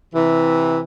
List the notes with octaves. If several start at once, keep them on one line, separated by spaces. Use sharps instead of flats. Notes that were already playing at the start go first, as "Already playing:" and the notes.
C3 E3